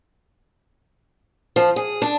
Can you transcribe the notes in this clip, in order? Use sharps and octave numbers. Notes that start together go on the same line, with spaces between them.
F3
G#4
D4